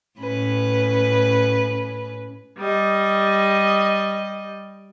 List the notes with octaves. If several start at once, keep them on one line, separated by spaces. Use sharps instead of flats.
A2 C#4 B4
G3 D#5